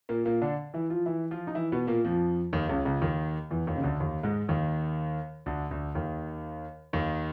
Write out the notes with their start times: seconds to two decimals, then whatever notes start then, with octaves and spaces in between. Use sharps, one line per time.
0.09 A#2 A#3
0.26 A#2 A#3
0.42 D3 D4
0.74 E3 E4
0.90 F3 F4
1.06 E3 E4
1.31 F3 F4
1.47 D#4
1.55 E3 E4
1.72 B2 B3
1.87 A#2 A#3
2.04 F2 F3
2.53 D#2 D#3
2.69 C#2 C#3
2.85 C#2 C#3
3.01 D#2 D#3
3.51 E2 E3
3.67 D#2 D#3
3.76 C#3
3.83 D2 D3
4.00 D#2 D#3
4.23 G#2 G#3
4.49 D#2 D#3
5.46 D2 D3
5.70 D2 D3
5.95 D#2 D#3
6.93 D#2 D#3